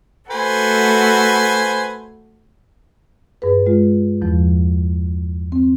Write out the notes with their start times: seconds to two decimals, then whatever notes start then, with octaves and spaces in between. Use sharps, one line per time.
0.31 A3 F#4 A4 B4 C5 G#5
3.42 G2 G#4 B4
3.66 G#3 F4
4.22 E2 F3
5.52 C4